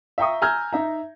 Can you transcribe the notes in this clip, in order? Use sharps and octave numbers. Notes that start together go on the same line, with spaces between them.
E5 F5 G5 A#5 C#6 D#6
G#5 A#5 E6 F6 G6 G#6
D#4 E5 A#5